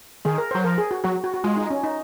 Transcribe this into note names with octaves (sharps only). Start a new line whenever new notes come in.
D#3 G#4
A#4
F#3 C5
F3 A#4
G#4
F#4
F#3 F#4
F#4
F#4
G#3 F4
D#4
C#4
D#4